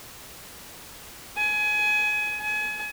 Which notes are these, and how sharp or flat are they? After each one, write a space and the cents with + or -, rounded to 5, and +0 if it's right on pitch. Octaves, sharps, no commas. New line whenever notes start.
G#5 +25
G#5 +35